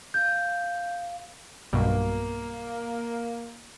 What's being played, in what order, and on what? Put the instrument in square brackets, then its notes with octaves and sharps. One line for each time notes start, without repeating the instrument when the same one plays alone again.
[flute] F5 [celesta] G6
[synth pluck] B1 G2 B2 [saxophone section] A#3